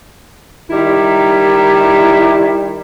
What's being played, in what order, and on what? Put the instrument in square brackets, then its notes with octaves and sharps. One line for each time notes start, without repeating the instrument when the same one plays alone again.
[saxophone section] D#3 G3 E4